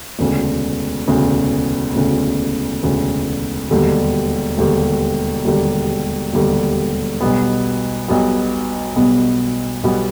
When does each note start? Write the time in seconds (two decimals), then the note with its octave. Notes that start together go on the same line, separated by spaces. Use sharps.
0.19 E1 D2 C#3
1.08 E1 D2 C#3
1.95 E1 D2 C#3
2.83 E1 D2 C#3
3.71 E1 D#2 D3 G3
4.58 E1 D#2 D3 G3
5.45 E1 D#2 D3 G3
6.33 E1 D#2 D3 G3
7.21 B1 B2 G3 B3
8.08 B1 B2 G3 B3
8.96 B1 B2 G3 B3
9.84 B1 B2 G3 B3